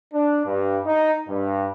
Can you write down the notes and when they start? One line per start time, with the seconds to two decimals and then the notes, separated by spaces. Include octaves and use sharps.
0.14 D4
0.46 G2
0.85 D#4
1.28 G2